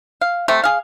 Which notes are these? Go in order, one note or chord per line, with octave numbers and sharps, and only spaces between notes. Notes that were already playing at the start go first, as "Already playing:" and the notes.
F5
C3 A3
G#4 F5